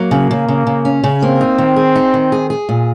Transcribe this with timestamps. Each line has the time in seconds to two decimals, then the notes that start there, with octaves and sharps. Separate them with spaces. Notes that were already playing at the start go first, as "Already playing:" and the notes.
Already playing: F#3 A#3
0.11 C#3
0.31 C#3
0.48 C#3
0.67 C#3
0.85 C#4
1.04 C#3
1.22 A#3 C4
1.41 D#4
1.58 D#3
1.76 G#4
1.95 D#4
2.14 D#3
2.32 G#4
2.50 G#4
2.69 A#2